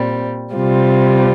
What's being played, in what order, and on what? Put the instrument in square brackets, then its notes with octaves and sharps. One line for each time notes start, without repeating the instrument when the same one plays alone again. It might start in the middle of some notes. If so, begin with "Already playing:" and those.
Already playing: [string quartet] A#2 G3 C4
C3 G3 C4 F4